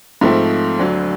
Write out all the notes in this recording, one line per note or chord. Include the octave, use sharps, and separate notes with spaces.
G#2 F3 A3 C4
D2 D3 F#3